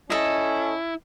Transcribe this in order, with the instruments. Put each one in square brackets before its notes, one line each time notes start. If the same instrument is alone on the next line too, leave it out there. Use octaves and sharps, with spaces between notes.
[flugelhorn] C#4 [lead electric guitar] E4 [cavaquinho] A4 D#5